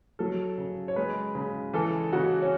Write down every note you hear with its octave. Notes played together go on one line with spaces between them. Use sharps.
F#3 A4
C#3
C#5
G#3 B4
C#3
E3 A4
C#3 F#4
C#4